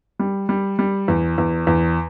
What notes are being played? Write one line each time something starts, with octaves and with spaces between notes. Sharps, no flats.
G3
G3
G3
E2
E2
E2